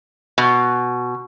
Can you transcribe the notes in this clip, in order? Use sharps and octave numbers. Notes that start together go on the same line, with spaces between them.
B2